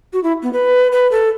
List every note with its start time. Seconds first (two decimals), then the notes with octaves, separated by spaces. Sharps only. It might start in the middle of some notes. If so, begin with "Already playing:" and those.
0.13 F#4
0.24 E4
0.43 B3
0.53 B4
0.92 B4
1.11 A4